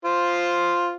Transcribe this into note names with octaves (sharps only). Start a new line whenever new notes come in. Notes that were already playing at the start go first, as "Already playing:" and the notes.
F4 C5